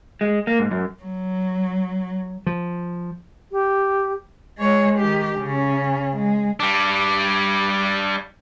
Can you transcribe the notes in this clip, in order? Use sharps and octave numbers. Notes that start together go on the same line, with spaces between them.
G#3
A#3
G#2
F#2
F#3
F3
G4
G#3 C#5
D#3 G4
C#3 C#4
G#3
G3 D4